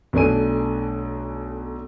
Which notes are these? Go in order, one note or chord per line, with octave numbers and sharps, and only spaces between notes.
B1 A3 D4 G#5 D#7